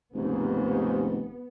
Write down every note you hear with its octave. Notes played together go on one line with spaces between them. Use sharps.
F1 D#2 G#2 C#3 B3